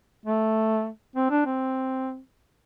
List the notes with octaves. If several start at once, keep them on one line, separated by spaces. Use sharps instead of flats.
A3
C4
D4
C4